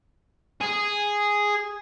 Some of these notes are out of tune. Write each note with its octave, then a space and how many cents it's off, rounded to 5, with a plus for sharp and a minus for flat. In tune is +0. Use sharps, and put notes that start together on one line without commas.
G#4 -5